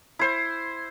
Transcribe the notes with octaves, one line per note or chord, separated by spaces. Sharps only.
E4 C5